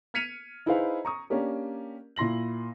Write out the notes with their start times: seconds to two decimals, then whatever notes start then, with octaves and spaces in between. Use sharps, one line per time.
0.14 F6 G#6 B6 C#7 D#7 F7
0.66 D#4 E4 G#4 B4 C5 F5
1.05 A#5 C#6 D#6
1.30 A#3 C#4 D4 G4 A#4
2.16 A#2 E4 C6 A#6 F#7